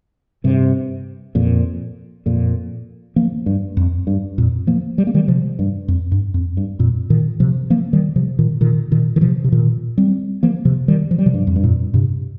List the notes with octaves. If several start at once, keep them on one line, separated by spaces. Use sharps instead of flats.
G2 C3
F2 A#2
F2 A#2
F3 A#3
G2
F2
G2
F2 A#2
F3 A#3
G3
A#3
D#3 G3
C3 F3
G2
F2
G2
F2
G2
F2 A#2
A#2 D#3
C3 F3
F3 A#3
D#3 G3
C3 F3
A#2 D#3
A#2 D#3
A#2 D#3
D#3
C3 F3
C3
A#2 D#3
G3 C4
F3 A#3
C3 F3
D#3 G3
F3
G3
C3 F3
G2
F2
G2
F2 A#2
G2 C3